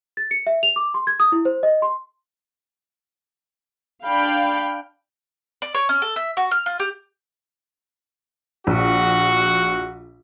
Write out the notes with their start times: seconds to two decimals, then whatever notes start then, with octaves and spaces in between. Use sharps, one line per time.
0.17 A6
0.31 C#7
0.47 E5
0.63 F7
0.76 D6
0.94 C6
1.07 G#6
1.20 D#6
1.32 E4
1.45 C5
1.63 D#5
1.82 C6
4.05 D4 F5 G5 B5
5.62 D5
5.75 C#5
5.89 C#4
6.02 A4
6.16 E5
6.37 F#4
6.51 F6
6.66 F4
6.80 G4
8.67 A#1 F#4